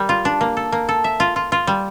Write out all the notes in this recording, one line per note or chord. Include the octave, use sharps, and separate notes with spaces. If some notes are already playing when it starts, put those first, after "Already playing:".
Already playing: G3 A#4
F4
D4
A#3
A4
A#3
A4
E5
F4
F4
F4
G3